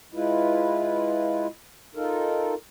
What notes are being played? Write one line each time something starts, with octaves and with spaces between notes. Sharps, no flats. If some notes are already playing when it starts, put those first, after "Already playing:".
G#3 E4 F4 B4
D#4 F4 A4 A#4